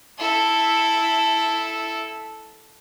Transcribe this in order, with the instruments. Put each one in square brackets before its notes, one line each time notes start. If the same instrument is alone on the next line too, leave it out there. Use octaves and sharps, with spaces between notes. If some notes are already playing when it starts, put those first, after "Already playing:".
[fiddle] E4 A4